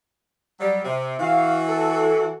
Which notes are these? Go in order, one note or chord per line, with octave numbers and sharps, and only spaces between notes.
F#3 G3
C3
E3 F#4 F5
A4